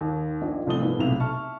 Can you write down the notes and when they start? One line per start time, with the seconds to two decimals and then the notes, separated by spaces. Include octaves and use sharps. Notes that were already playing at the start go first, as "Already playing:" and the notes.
0.01 D#2 D#3
0.42 A#1 A#2 D#5
0.67 C2 F3 A3 D#6 G7
0.81 G#2 B3 E4
0.99 B1 C3 A3 E4 F7
1.20 E5 A5 C#6 F6